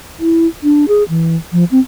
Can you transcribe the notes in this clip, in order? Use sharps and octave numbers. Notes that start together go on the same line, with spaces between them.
E4
D4
G#4
E3
F3
C4